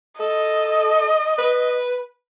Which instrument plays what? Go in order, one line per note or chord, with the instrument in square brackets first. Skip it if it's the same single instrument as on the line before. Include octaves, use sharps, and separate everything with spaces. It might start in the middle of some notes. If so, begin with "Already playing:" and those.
[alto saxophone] A4 [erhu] D#5
[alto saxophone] B4